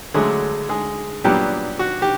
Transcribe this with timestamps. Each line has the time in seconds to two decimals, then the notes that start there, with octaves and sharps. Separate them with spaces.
0.14 D2 D3 F#3 G#3 A3 C#4 G#4
0.69 G#3 G#4
1.24 A#2 F#3 G3 B3 D4 G4
1.79 F#4
2.02 G4